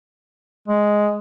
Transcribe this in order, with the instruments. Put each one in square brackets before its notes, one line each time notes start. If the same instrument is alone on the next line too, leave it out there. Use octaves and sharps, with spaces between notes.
[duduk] G#3